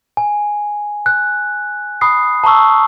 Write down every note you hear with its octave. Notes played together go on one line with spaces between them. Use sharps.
G#5
F#6
B5 D#6 C7
A5 A#5 C#6 E6